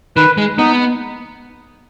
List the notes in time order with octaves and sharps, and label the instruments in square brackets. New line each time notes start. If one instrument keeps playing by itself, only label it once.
[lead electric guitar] D#3 [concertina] B4
[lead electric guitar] G#3
[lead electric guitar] B3 [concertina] D#4